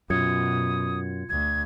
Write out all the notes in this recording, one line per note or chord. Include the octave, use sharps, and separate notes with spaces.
F#2 B2 F4 D#6 G#6 C#7
D2 G#6